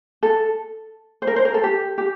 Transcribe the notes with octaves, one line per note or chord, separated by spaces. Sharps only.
A4
C5
A#4
C5
A#4
A4
G4
G4